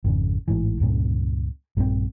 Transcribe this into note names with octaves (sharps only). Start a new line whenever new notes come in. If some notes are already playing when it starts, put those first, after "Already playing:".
G#1 F2 C#3
A1 G#2 E3
C#2 G2 A#2 C#3
A#1 G2 F3 C4